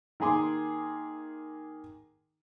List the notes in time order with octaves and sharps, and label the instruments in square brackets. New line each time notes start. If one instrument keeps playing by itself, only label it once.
[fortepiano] D#3 A#3 G#4 C6 D6